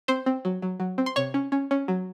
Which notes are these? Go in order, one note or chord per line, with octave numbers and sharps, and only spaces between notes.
C4 C5 C6
C4
F#3
F#3
F#3
C4
C6
C3 C#5 C#6
C#4
C#4
C#4
F#3